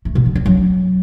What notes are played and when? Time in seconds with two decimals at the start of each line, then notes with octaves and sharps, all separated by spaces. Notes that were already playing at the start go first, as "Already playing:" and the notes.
0.05 A3
0.15 B2
0.25 E3
0.35 C#4
0.46 F#3